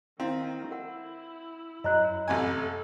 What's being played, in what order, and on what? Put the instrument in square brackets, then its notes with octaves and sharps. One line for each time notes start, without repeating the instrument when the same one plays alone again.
[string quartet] D#3 [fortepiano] C4 [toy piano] E4 F5
[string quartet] E4 [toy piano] A#4 F#5
[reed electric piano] F#2 A#5 F#6 [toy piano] F#4 C#5 D#5
[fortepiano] A1 C3 G#5 [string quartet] A4